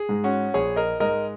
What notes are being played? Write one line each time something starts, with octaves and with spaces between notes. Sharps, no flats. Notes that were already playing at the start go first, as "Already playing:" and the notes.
Already playing: G#4
G#2 G#3
C#4 F#4
A#1 G#4 C#5
A#4 D#5
G#2 G#3 A#4 D#5